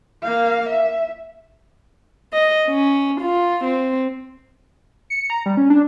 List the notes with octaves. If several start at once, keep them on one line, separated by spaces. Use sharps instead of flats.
A#3 F5
E5
D#5
C#4
F4
C4
C#7
A#5
G3
C#4
D4